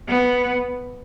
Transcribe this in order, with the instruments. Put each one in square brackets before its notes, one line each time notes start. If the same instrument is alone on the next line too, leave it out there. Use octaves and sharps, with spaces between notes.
[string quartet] B3